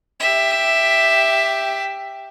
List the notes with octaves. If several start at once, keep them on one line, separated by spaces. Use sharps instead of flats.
G4 E5